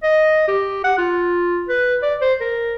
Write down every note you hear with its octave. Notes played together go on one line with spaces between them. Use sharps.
D#5
G4
F#5
F4
B4
D5
C5
A#4